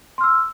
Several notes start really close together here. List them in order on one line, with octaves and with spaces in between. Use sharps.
C6 F6 E6